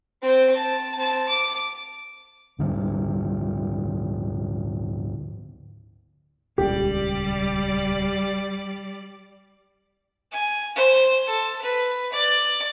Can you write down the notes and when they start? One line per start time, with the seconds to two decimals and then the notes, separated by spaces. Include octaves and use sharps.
0.23 C4 C5
0.56 A5
0.98 C4 A5
1.28 D6
2.59 D2 G#2 D3 G3
6.58 D#1 C#2 C#3 G3 G4 D5
10.33 G#5
10.76 C5
11.27 A4
11.62 B4
12.13 D5